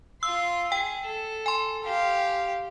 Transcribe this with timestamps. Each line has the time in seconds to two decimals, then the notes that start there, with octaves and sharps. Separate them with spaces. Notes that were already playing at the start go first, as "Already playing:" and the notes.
0.23 F4 C6 E6
0.72 G#4 G5
1.05 A4
1.46 G#5 C6
1.83 G4 F5